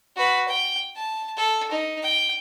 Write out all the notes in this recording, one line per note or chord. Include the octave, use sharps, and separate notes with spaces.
F#4 B4
G5
A5
A4
D#4
G5